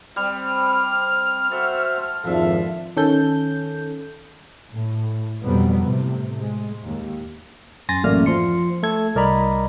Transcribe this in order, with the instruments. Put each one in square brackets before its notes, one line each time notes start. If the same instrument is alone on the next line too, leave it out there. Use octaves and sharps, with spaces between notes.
[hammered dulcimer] G3 [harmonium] C4 [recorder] F6
[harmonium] F#4 C5 E5 [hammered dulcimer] A4
[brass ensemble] G#1 F2 F3 [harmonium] D4 A4 [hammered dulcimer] E5 F5
[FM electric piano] D#3 C#4 A4 G6
[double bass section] A2
F2 B2 F#3 G3 B3
A2 C3
G#3
D#2
[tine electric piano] F#2 G#5 C6 A6 A#6
A1 F#2 A3 A#3 D5 F6
F3 C6 C#7
A3 A4 G#6
C2 A#4 D5 D#5 A#5 B5